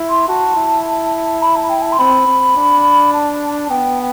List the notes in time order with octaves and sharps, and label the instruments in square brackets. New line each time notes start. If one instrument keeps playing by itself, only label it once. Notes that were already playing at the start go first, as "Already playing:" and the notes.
Already playing: [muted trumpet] E4
[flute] C6
[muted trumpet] F#4 [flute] A5
[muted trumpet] E4
[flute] B5
A5
G5
A5
C6
[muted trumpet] C4 [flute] B5
[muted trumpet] C4
D4
[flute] A5
[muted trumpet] B3 [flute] G5